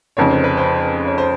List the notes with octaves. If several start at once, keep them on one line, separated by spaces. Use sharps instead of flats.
F1 F2 C#3 C#5
C5
B4
C5
C#5
C5